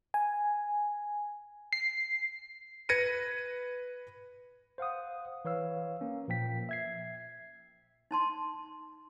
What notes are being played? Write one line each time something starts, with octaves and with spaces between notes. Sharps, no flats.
G#5
C7
B4 G#6 A#6 C#7 D#7
C5 F5 F#5 D#6
E3 B4 C#5 F5 E6
A#3 C#4
A#2 F3 A#3 G5 B6
E5 G#6 C7
D#4 A5 C6